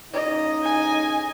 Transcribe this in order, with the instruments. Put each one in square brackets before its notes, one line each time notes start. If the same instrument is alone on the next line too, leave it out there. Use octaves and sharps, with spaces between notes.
[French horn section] A2 C#3 D#4 [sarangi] D#5
[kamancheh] G#5